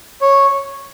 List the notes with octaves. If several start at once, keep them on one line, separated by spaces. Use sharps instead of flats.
C#5